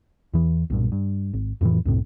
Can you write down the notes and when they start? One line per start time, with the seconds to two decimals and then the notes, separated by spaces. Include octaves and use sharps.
0.34 E2 E3
0.70 B1 G2 A#2
0.92 G2
1.34 G#1
1.61 F2 A2 D3 E3
1.85 C2 F#2 A2 C3